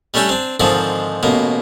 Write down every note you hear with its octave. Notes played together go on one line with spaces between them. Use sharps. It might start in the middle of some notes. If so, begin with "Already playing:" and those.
G3 A3 C#4 D4 G4 A4
C4 D4
G#2 D3 D#3 F3 C4 D4
A1 B2 A#3